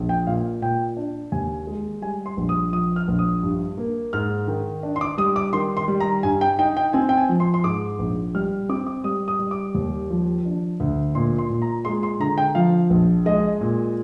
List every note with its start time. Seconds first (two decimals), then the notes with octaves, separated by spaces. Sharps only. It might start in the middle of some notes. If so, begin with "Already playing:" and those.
Already playing: A#1
0.09 G5
0.27 A#2 F5
0.62 A#2 G5
0.97 D4
1.32 D#2 G#5
1.67 G#3
2.02 G3 G#5
2.26 C6
2.37 A#1
2.49 D#6
2.73 F3 D#6
2.96 F6
3.08 A#1
3.19 D#6
3.43 G2
3.78 A#3
4.13 G#2 F6
4.48 D#3
4.83 D4
4.96 C6
5.01 D6
5.18 G3 D#6
5.36 D6
5.53 D#3 C6
5.77 C6
5.88 G3
6.00 A#5
6.23 G2 G#5
6.41 G5
6.59 D#4 G5
6.77 G5
6.93 C4 G#5
7.09 G5
7.17 G#5
7.29 F3
7.40 C6
7.54 C6
7.64 G#2 D6
7.99 A#1
8.35 G3 F6
8.69 C4 D6
8.87 D6
9.04 G3 D#6
9.28 D#6
9.39 G3
9.51 D6
9.75 D#2
10.10 F3
10.45 D4
10.80 D2
11.15 A#2 C6
11.38 C6
11.50 A#2
11.62 A#5
11.85 G#3 C6
12.03 C6
12.20 D3 A#5
12.38 G5
12.55 F3 F5
12.90 A#1
13.26 G#3 D#5
13.61 A#2